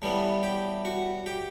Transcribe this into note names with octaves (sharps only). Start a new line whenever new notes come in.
A2 E3 G3 B3
G4
F#4
G4